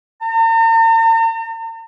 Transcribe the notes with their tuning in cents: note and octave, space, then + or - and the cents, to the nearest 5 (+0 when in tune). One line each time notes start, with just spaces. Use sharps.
A#5 -45